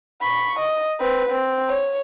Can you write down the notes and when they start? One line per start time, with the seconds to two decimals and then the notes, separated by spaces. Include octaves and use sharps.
0.21 B5 C#6
0.59 D#5
1.00 C4 B4
1.29 C4
1.69 C#5